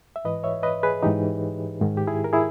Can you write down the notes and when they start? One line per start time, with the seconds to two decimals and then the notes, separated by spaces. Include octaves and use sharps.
0.16 E5
0.25 G#2 E3 B4 D#5
0.44 C#5 E5
0.63 B4 D#5
0.83 G#4 B4
1.02 G#2 E3 D#4 G4
1.81 G#2 D#3
1.97 G4
2.07 E4 G#4
2.24 A#4
2.33 E4 G#4